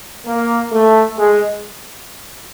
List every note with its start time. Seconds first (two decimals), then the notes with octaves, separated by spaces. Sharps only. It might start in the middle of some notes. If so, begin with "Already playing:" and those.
0.26 A#3
0.72 A3
1.18 G#3